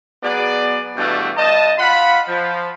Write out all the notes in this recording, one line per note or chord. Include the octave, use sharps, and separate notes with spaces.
F#3 B3 G#4 D5
G2 B2 E3 G3 A3 D5
G2 D#5 A5
F4 F5 F#5 B5
F3